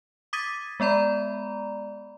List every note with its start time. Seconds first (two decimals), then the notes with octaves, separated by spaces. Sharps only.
0.33 D6 D#6 G#6 A6 B6 D#7
0.80 G#3 B3 D5 A#5 B5